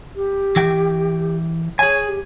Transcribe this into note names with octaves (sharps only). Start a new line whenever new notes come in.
G4
E3 G5
G#4 C#5 G#5
G4